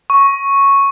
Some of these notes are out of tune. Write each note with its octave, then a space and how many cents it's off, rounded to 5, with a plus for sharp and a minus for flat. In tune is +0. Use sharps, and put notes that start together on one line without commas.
C#6 -5